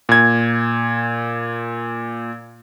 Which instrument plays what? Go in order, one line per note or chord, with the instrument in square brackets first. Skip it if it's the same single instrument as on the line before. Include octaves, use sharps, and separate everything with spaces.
[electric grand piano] A#2 G#6